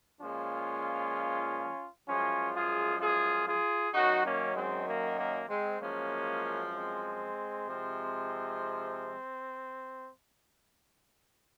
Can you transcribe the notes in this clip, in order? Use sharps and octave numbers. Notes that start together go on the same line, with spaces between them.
A#2 F3 G#3 C#4 F4
F#2 F3 G#3 C#4 F4
F4 G#4
F4 G#4
F4 G#4
F#2 D#3 F#3 D#4 F#4
A#3 C#4
G#3 C4
A#3
A#3
G#3 C4
F#2 F3 G#3 A#3 C#4
G#3 C4
C3 F3 G#3